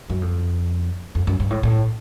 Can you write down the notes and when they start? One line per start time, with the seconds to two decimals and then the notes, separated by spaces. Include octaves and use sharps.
0.10 F#2
0.21 F2
1.15 F2
1.27 F#2
1.40 G2
1.50 A2
1.63 A2